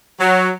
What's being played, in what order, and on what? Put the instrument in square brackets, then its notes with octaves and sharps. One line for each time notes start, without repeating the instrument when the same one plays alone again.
[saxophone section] F#3